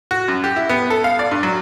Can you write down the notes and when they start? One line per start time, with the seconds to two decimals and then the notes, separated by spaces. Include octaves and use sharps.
0.11 F#4
0.28 F#2
0.44 G4
0.56 E4
0.69 B3
0.90 A4
1.04 F5
1.19 D5
1.31 G2
1.43 F#3